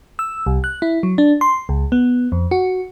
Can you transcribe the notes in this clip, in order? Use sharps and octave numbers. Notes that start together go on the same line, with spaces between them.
E6
C2
F#6
E4
F#3
D4
C6
C#2
B3
F2
F#4